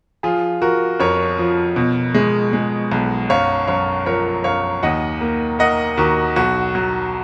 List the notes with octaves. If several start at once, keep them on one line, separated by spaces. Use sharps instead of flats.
F3 F4 G#4
F3 F#4 A#4
F2 A#4 C#5
F3
B2
G#3
G#3
B1
F#2 C#5 F5
F#2 C#5 F5
F3 A#4 C#5
F#2 C#5 F5
D#2 D#5 F#5
A#3
A#3 D#5 F#5
D#2 F#4 A#4
B1 F#4
F#3